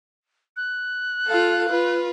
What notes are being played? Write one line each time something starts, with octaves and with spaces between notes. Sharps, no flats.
F#6
F4 A4 F5
F4 B4